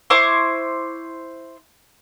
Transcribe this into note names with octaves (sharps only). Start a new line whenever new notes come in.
E4 C5 C#6 D6